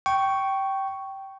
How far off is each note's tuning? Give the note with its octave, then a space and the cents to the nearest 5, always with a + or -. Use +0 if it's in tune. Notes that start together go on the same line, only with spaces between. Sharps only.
G5 -15 C#6 +0